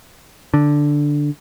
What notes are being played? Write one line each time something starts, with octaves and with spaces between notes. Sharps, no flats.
D3